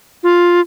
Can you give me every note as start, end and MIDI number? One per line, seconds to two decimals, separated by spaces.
0.23 0.61 65